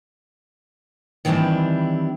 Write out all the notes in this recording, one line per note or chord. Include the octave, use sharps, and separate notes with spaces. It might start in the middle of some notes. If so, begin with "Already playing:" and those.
D#3 E3 G3 C4 D4 E4